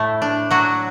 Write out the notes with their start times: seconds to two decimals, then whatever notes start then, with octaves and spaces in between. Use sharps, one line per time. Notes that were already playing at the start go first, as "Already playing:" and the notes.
Already playing: A2 A3 E4
0.22 D4
0.51 F#3 F#4